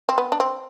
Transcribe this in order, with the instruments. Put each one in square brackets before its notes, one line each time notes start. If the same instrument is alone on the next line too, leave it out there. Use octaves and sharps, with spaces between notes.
[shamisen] C4
B3
D4
C4